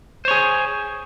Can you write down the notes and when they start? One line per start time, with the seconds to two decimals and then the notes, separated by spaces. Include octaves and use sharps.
0.25 C5
0.28 C#5
0.31 G#4